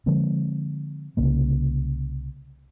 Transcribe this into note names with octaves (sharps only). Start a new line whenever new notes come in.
D3 F3 G#3 C4
C2 C#3 A#3